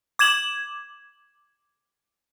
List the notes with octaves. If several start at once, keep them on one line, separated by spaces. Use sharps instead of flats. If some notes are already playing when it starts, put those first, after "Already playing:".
D6 G#6 E7 F#7